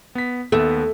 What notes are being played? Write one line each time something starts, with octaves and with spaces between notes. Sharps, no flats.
B3 B6
D#2 A3 B3